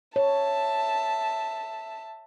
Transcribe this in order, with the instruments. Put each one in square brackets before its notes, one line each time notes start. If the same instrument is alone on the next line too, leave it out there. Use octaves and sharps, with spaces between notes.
[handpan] C#5 [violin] E5 A5